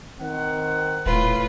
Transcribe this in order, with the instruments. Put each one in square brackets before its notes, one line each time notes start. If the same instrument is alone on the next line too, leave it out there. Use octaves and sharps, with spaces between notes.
[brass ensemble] D#3 C4 F#5
[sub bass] D#1 [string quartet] A2 F4 B4